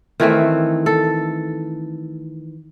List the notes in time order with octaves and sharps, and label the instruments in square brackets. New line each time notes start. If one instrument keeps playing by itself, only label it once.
[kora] D#3 E3 A3 C4
A4